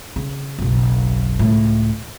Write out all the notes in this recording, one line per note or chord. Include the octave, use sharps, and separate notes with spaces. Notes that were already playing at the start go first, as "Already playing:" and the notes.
C#3
F#1 B1
C#2 A2